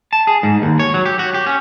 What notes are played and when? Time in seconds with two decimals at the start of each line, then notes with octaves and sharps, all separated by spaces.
0.13 A5
0.27 G#4
0.43 G#2
0.62 D#2
0.79 C#5
0.94 F#3
1.06 G4
1.19 F#4
1.34 G4
1.46 C#4